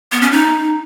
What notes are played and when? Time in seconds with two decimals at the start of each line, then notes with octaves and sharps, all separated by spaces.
0.12 B3
0.21 C#4
0.32 D#4